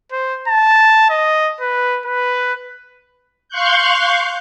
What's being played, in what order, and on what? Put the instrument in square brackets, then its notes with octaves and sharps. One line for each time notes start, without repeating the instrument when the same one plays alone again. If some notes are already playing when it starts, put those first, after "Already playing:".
[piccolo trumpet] C5
A5
D#5
B4
B4
[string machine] F5 C6 C#6 F#6 G6